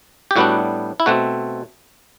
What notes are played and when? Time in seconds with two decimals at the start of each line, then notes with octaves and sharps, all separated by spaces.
0.31 G4
0.36 A2 G3 B3 D4 F#4
1.00 E4
1.06 B2 A3 C4 F#4